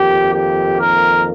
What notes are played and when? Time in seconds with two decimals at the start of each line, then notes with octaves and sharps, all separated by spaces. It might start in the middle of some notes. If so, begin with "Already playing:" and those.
Already playing: F2 D#3 A#3 G4
0.32 G4
0.78 A#4